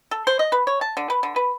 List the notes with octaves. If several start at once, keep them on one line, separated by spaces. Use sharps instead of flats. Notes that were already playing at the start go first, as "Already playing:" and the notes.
A4
C5
D#5
B4
C#5
A5
D3
B4
D3
B4